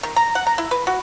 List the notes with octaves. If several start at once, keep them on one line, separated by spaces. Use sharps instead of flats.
D#3
A#5
F#5
A#5
E4
B4
F#4